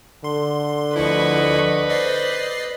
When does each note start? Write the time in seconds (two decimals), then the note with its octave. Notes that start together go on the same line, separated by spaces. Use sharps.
0.24 D3 C6
0.96 D2 F3 E4 B4 D#5 C#6
1.89 C5 D5 D#5 C7